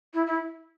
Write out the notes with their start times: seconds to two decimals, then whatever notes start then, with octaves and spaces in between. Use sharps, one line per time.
0.14 E4
0.26 E4